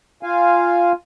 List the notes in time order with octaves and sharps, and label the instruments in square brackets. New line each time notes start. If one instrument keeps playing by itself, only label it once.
[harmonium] F4 F5 G#5